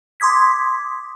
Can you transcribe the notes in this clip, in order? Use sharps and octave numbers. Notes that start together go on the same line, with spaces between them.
C6 D6 D#6 G#6 B6